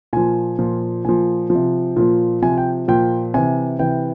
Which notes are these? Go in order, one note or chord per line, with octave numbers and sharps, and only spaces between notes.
A#2 F3 G#5
A#2 F3
A#2 F3 G#5
C3 F3
A#2 F3
C3 F3 G#5
G5
A#2 F3 G5
C3 E3 G#5
C3 E3 G5